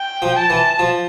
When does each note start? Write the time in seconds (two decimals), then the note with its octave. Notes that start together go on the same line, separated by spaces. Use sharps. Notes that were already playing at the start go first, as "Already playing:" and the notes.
Already playing: G5
0.22 F3
0.36 A5
0.50 E3
0.79 F3